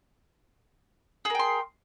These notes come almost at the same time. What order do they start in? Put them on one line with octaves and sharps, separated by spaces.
G#4 A#4 G5 C6